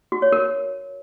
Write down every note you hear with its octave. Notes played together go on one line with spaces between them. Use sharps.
F#4
C#5
A#4